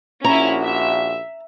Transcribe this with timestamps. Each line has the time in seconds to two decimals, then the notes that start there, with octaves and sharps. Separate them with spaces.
0.24 A#1 A#2 C#4 E4 F#4 A#5
0.62 E5